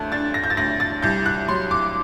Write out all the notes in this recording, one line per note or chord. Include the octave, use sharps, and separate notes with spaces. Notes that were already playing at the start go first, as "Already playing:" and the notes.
Already playing: D2 A3 A5 F#6 G6
D4 A6
A#6
G6
A6
D2 A#6
A6
C2 G6
F#6
F#3 C6
D6